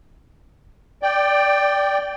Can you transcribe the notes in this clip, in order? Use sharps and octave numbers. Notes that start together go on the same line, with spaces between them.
D5 G5